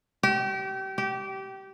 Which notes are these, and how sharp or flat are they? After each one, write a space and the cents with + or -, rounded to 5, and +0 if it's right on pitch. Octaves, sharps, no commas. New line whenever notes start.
G4 -30
G4 -20